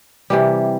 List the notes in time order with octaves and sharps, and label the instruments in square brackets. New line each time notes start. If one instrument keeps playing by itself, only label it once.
[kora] C3 E3 G3